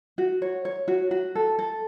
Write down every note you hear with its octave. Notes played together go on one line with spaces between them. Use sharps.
F#4
C#5
C#5
F#4
F#4
A4
A4